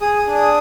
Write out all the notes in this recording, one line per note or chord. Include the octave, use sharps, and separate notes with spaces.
G#4 D#6
D#6
D4
D#6